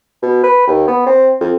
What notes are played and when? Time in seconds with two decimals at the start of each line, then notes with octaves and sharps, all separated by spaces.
0.23 B2
0.44 B4
0.67 D#2
0.88 B3
1.06 C4
1.41 F2